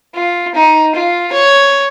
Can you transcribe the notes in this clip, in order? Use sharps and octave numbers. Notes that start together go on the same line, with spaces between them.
F4
D#4
F4
C#5